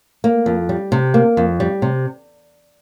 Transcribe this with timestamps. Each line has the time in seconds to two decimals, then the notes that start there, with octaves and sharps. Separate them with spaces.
0.24 A#3
0.46 F2
0.69 G3
0.92 C3
1.14 A#3
1.37 F2
1.60 G3
1.82 C3